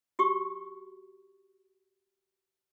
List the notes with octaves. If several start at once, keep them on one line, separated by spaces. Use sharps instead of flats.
F#4 G4 C#6